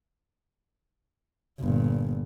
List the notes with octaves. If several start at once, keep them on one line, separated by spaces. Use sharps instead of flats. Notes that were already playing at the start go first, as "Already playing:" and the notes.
G1 A#2